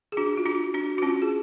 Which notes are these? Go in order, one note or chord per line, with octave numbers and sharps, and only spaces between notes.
G#4
D4 F#4
F4
D4 F#4
D4 F#4
F#4
C#4 F4
G#4